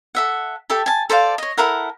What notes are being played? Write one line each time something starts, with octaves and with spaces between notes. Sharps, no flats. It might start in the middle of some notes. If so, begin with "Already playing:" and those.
A4 E5 F#5
G4 A4 E5 A5
G#5 A5
A4 C5 D5 F5
C#5 D#5
E4 A4 A#4 F#5